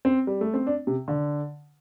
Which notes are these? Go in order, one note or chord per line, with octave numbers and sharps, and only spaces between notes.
C4
G3
A3
C4
D4
C3
D3